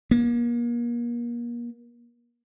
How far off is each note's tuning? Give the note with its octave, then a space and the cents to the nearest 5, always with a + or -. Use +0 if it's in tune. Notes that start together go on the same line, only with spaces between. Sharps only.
A#3 +35